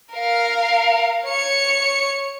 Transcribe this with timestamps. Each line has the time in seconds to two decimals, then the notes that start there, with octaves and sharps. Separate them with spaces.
0.12 A#4 F5
1.26 C#5 C#7